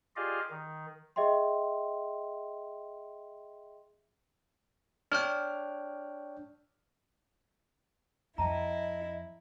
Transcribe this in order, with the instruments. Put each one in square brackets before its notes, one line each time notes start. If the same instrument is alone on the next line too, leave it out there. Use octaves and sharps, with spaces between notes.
[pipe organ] F4 G4 G#4 D5 D#5 F5
D#3
[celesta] G#4 D#5 E5 G5 C6
[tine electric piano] D4 C#5 G5 [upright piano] F6
[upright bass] F2 [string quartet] E4 [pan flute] D#5 [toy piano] G5 A5 A#5